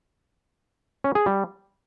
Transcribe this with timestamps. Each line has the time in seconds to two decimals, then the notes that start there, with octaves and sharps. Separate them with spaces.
1.04 C#4
1.15 G#4
1.26 G3